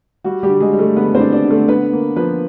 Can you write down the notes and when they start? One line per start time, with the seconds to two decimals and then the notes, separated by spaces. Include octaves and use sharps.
0.24 G3 F#4
0.43 G3 G4
0.49 D3
0.60 G#3 G#4
0.73 G3
0.79 A3 A4
0.96 D3 B3 B4
1.15 C4 C5
1.20 D4
1.32 D4 D5
1.45 D3
1.50 A3 A4
1.68 D3 B3 B4
1.93 A#3
2.16 F3 B3 B4